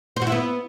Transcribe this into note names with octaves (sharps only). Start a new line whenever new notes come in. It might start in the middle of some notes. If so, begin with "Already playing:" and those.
C5
F#4
E4
B3